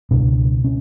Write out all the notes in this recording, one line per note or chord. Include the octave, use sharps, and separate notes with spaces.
C#2 B2 D4
C#4